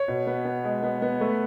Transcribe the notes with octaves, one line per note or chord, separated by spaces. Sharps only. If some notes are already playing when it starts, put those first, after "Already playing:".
Already playing: C#5
B2
B3
B3
G#3
B3
B3
A3 B4